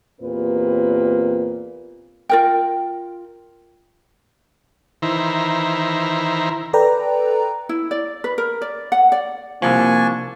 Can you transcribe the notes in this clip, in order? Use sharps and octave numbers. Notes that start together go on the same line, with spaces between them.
E2 A#2 C4 G4 A#4 B4
F4 A#4 G5
D#3 E3 E4 C5 A#5
A4 B4 D5 G5 A#5
E4
D5
B4
A#4
D5
F#5
D5
C2 F3 A#3 D4 G#5 C#6